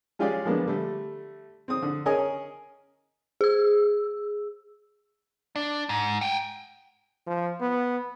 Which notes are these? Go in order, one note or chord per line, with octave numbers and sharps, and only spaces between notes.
G#3 C#4 F4 G4 G#4 D5
F3 G#3 A#3 B3 D4
D3 G3 A3
C4 D#6
D3
C#4 G#4 A#4 C#5 D#5 G#5
G#4 E6
D4
G#2
F#5 G5
F3
B3